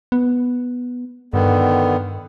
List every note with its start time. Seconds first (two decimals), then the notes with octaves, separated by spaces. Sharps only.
0.12 B3
1.33 G2 D3 D#3 B3